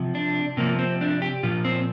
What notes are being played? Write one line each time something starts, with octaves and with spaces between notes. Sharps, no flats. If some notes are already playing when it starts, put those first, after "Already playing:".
Already playing: C3 F3
D4
C3 F3 A#3
C4
D4
G4
A#2 F3 F4
C4